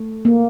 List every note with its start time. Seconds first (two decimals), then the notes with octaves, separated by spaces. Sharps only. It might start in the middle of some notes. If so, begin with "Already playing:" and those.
Already playing: A3
0.25 A#3